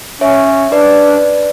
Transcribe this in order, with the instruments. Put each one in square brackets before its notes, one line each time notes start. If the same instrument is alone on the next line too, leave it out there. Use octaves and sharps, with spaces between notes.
[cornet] C#4 [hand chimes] C#5 E5
[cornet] D4 [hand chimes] B4 D5